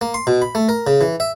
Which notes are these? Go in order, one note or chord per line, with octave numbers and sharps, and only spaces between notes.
A#3
C6
B2
B5
A3
A#4
C#3
E3
E5